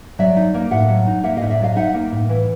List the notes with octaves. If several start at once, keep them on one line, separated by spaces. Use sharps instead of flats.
F#3 D5 E5
D#4
A#3
A2 E5 F#5
F#3
D#4
A#3 E5 F#5
A2 D#5 F5
D5 E5
F#3 D#5 F5
D#4 E5 F#5
A#3
A2
E3